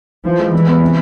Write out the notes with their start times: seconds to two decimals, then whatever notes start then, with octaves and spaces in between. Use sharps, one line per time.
0.25 E3 F3
0.39 G#3
0.53 E3 G3
0.67 B3
0.81 C3